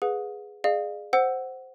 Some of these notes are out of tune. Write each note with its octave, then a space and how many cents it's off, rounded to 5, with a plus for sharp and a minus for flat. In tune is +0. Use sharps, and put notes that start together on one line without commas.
G#4 +0 B4 +0 F#5 -40
G#4 +0 D5 +45 F5 +0
C5 +0 F#5 +10 E6 +0